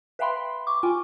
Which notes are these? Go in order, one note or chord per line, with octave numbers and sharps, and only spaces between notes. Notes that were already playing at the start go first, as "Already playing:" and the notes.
B4 E5 F5 G5 B5 C6
C#6 D6
F4 G5 G#5